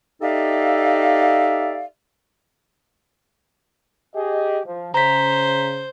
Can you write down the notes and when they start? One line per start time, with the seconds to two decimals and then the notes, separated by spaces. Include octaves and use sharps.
0.22 D#4 G4 A4 D5 E5 F5
4.15 G4 G#4 D#5
4.66 F3
4.94 C#3 C5 A#5 B6